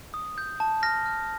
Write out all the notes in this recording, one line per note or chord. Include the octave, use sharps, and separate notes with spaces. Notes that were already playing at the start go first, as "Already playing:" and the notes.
D#6
G6
A5
F6 A#6
F6